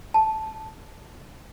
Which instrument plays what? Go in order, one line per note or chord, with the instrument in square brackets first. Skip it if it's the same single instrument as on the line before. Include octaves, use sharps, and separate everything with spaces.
[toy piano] A5